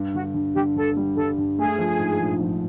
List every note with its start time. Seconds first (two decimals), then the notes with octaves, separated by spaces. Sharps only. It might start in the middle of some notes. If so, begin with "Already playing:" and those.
Already playing: G2
0.14 D3 F#4
0.34 G2
0.55 D3 G4
0.76 G2 A4
0.97 G3
1.16 G2 A4
1.38 G2
1.59 A3 G#4
1.78 F3
1.99 G#2
2.20 A#1
2.41 F3